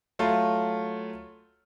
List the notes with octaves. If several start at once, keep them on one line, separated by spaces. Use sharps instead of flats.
F#3 A3 F4